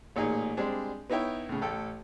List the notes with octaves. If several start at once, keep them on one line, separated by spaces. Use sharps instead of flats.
A1 A#2 D#4 G#4
G3 G#3 C4 D4
B3 D#4 E4 C#5 G5
A2 C#3
A1 A4 G5